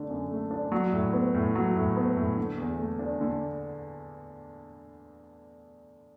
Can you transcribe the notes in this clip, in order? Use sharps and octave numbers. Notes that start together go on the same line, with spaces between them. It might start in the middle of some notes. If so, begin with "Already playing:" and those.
Already playing: D3 A3 D4
F#2
A3
D4
F#3
A2
B3
A2
F#3
A2
B3
A2
D3
E2
A3
D4
D3